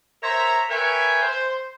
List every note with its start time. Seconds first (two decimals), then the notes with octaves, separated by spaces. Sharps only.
0.23 A#4 C5 C#5 E5 A#5
0.69 A#4 B4 C#5 E5 G5 G#5
1.22 C5